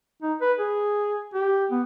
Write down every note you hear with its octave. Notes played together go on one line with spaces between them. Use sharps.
D#4
B4
G#4
G4
B3